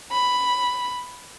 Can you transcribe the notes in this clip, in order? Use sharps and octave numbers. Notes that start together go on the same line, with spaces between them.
B5